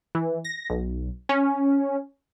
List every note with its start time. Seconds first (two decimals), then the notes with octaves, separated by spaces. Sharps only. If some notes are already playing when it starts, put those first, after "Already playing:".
0.15 E3
0.45 A#6
0.70 B1
1.29 C#4